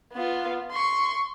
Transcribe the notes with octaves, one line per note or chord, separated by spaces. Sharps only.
B3 F4
C6 C#6